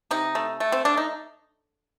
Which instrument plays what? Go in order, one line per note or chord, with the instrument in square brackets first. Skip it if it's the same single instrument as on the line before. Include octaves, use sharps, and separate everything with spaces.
[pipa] C3 D#4
A3
A3
C4
A3 D4
D#4